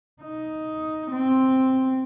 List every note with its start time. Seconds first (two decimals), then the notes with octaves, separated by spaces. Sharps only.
0.22 D#4
1.11 C4